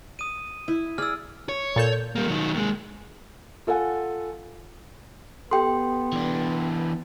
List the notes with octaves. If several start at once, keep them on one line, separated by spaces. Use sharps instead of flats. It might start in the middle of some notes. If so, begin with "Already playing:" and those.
D#6 D#7
E4
G#4 D5 E6 F6
C#5
A#2 A4 G6
G3 A#3
D#3 F#3
D#2 G#3
F4 A4 F#5 G#5
B3 G4 A4 G5 C6
E3 D4